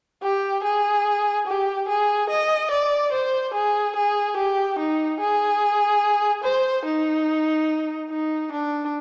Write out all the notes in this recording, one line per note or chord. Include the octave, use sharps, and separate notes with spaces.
G4
G#4
G4
G#4
D#5
D5
C5
G#4
G#4
G4
D#4
G#4
C5
D#4
D#4
D4